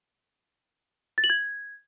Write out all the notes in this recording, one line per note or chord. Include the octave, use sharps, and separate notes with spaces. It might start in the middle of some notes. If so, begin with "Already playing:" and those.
A6
F#7
G#6